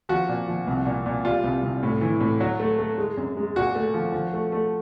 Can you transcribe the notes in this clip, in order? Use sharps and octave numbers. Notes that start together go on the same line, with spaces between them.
F3 F#4
A#2
F3
C2
A#2
A#2
G3 F4
C2
C2
A2
E3
A2
F#3
A3
A3
G#3
F#2
G#3
A#2 F#4
A3
F3
F3
A3
A3